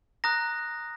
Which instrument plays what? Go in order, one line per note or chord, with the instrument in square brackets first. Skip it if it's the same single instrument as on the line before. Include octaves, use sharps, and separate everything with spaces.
[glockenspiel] A#5 D#6 F#6 A#6